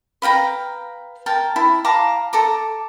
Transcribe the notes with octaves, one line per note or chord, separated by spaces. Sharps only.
B4 F5 G5 A#5
A#4 G5 A5
E4
F5 A5 A#5 D6
A4 A#5 D6